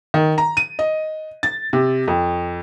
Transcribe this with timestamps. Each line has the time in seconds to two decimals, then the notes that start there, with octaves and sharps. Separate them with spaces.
0.14 D#3
0.38 A#5
0.57 D#7
0.79 D#5
1.43 A6
1.73 C3
2.08 F2